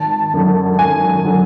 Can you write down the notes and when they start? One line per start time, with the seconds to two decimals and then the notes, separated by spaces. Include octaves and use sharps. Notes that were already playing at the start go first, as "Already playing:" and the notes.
Already playing: G#1 A5
0.34 F#2 D3 F#3
0.79 G#1 G#5
1.25 D3 F#3